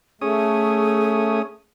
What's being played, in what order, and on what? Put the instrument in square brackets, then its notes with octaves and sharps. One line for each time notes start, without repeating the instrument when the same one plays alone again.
[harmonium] A3 [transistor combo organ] C#4 D#6 [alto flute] G#4